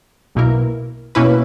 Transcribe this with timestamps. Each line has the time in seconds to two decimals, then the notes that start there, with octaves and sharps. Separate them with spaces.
0.35 B1 B2 A#3 E4 A#4
1.15 B2 A#3 C#4 E4 B4